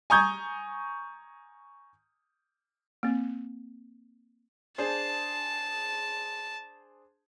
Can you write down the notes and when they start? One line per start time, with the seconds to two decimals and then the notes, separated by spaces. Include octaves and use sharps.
0.10 G#5 A#5 C#6 D#6 G6 G#6
3.03 A#3 C4
4.78 D4 G#4 C5 A5